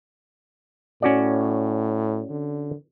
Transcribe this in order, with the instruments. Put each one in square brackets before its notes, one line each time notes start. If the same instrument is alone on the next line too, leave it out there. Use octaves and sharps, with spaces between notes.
[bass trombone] A2 [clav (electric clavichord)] C#4 F#4 D5
[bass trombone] D3